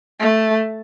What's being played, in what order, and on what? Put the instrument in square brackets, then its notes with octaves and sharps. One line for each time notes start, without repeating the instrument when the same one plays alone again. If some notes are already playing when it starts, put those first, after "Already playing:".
[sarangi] A3